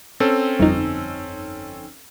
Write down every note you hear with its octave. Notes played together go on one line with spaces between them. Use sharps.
C4 C#4 A4
G1 F2 D#4